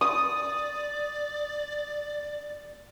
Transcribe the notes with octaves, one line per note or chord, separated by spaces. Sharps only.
D5 D#6